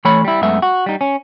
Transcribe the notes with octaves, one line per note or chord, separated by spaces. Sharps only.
E3 A3 C#5 B5
G3 E4
F#2 G#3 A3 B3 E5
F#4
G3 D#4
C#4